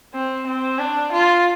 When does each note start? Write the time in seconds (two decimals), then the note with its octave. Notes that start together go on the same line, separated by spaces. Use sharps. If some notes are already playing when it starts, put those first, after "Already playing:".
0.14 C4
0.47 C4
0.79 D4
1.12 F4